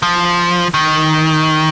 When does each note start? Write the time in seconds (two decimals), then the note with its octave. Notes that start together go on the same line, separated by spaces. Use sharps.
0.02 F3
0.74 D#3